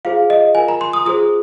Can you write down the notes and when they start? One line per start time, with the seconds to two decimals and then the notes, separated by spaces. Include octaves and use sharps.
0.05 F4 G#4 C5 F5
0.30 D#5
0.55 F4 A#4 G#5
0.68 A#5
0.81 C6
0.93 D#6
1.05 F4 G#4 C5 D#6